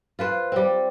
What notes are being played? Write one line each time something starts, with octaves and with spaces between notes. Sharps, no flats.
F4 B4 C5
G3 C4